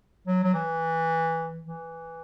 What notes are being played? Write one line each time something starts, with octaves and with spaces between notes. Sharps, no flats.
F#3
F#3
E3
E3